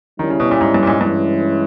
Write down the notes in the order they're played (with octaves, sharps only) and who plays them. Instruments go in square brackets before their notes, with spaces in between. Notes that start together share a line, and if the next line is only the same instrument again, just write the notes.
[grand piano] D#3 [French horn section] G3 C#4 E4
[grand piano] C#3
B2
A#2
G#2
G2
A#2
G#2
[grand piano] G2 [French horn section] E3 G#3 C#4 E4